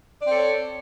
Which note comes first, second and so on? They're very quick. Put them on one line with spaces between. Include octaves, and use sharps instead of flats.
D5 C4 A4 C#5